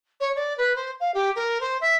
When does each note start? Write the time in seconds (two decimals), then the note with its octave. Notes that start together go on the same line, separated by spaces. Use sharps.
0.20 C#5
0.36 D5
0.57 B4
0.75 C5
1.00 F5
1.14 G4
1.35 A#4
1.60 C5
1.81 E5